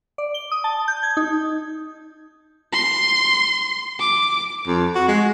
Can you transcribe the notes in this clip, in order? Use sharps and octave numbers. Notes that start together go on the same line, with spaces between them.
D5
G7
D#6
A5
G6
G#6
D#4
C6
D6
F2
F#4
G#3